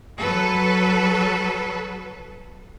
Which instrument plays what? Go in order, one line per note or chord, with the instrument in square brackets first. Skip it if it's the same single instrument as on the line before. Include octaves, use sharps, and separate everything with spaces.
[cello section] F#3 A4 B4